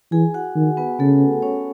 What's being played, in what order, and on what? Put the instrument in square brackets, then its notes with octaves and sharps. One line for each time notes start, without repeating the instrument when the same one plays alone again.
[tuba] E3 [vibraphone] G#4 G#5
[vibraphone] F#4 F#5
[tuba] D#3
[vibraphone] B3 B4
[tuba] C#3 [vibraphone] A3 A4
[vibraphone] C#4 C#5